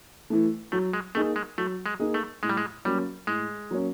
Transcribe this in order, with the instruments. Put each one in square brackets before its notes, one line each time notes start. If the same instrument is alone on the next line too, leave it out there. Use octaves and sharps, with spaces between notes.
[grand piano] E3 A3
[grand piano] F#3 [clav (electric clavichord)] A3
[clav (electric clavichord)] G#3
[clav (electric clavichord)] A3 [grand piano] A#3 D#4 G#4
[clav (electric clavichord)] G#3
[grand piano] F#3 [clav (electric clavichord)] A3
[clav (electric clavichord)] G#3
[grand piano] A#3 D#4 G#4
[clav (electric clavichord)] A3
[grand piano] A2 [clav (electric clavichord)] G#3
[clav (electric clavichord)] G3
G#3
[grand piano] F#3 A#3 C#4 [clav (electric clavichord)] G3
[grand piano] A2 [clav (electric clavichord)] G#3
[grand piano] F#3 A#3 C#4